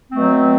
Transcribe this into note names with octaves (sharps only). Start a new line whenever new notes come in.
B2 F#3 A3 C4